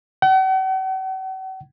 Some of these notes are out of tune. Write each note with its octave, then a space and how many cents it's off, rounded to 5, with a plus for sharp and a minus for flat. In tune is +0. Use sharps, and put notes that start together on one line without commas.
F#5 +45